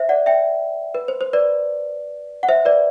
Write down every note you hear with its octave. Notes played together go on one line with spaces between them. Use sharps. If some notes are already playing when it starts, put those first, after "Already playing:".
Already playing: C5 E5
D5 F#5
E5 G5
B4
C5
C5
B4 D5
F#5
C5 E5
B4 D5